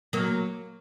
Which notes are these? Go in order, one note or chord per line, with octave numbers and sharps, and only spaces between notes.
F#3 A#3